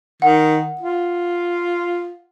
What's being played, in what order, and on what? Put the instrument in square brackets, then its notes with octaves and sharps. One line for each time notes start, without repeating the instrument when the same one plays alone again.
[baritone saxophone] D#3 [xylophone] F#5
[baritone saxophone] F4